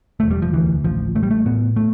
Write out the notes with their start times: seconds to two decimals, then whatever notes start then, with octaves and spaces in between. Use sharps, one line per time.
0.20 E1 A3
0.31 G3
0.42 F3
0.53 D2 E3
0.84 A1 F3
1.15 A1 A3
1.23 G3
1.31 A3
1.46 A2 B3
1.76 A3